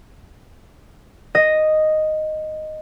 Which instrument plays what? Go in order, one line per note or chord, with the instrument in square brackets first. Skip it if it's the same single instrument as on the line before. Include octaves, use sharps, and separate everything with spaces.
[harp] D#5